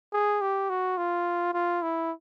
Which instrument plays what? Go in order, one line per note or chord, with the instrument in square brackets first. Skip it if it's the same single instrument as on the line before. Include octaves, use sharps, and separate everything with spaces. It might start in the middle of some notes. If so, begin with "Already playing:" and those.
[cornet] G#4
G4
F#4
F4
F4
E4